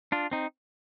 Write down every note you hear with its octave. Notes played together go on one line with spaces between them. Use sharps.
D4 F4
C4 D#4